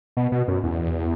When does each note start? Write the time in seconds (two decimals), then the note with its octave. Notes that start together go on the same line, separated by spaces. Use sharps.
0.17 B2
0.32 B2
0.48 F#2
0.63 E2